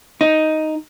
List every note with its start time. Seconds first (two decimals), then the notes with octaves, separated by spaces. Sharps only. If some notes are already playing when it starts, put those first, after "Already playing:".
0.21 D#4